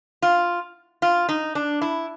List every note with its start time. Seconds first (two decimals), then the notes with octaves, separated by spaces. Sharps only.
0.22 F4
1.02 F4
1.29 D#4
1.55 D4
1.81 E4